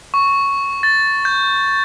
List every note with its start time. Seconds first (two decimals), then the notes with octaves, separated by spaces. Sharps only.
0.14 C#6
0.83 A6
1.25 G6